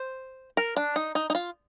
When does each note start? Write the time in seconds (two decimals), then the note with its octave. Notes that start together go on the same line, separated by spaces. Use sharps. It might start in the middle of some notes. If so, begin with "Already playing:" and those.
Already playing: C5
0.57 A#4
0.76 D4
0.96 D#4
1.15 D#4
1.30 D#4
1.35 F4